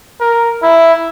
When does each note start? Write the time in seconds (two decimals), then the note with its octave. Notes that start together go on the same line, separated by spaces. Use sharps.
0.20 A#4
0.63 E4